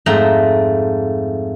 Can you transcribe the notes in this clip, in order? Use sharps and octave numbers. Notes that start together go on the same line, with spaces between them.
F2 G#2 A3 A#5